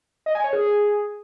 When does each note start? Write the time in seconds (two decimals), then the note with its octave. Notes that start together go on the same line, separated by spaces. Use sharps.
0.26 D#5
0.35 G#5
0.44 C#5
0.53 G#4